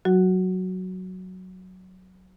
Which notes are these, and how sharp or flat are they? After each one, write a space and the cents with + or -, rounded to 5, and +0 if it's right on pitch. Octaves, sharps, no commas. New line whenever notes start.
F#3 +0 F#4 +0